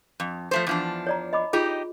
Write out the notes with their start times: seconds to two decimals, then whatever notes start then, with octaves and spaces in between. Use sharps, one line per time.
0.20 F2
0.51 F3 A3 C5
0.67 E2 F3 D4
1.07 C#5 D5 A#5
1.33 D#5 B5 D6
1.53 D#4 F4 G4 G#4